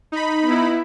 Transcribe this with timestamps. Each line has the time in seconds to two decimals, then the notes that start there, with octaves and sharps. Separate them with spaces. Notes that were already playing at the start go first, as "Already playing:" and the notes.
0.12 D#4 B5
0.47 B3 E4